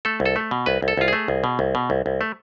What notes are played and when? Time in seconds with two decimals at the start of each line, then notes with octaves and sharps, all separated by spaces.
0.05 A3 A4
0.20 C2
0.25 A4
0.36 A3
0.51 B2
0.66 C2 B4
0.82 C2
0.88 A4
0.97 C2 F4
1.08 A3 G#4
1.28 C2
1.44 B2
1.59 C2
1.75 B2
1.90 C2
2.06 C2
2.21 A3